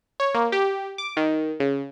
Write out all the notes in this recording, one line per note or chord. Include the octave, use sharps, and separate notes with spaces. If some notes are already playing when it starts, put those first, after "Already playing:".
C#5
A#3
G4
D6
D#3
C#3